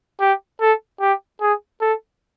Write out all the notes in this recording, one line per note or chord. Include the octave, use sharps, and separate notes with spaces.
G4
A4
G4
G#4
A4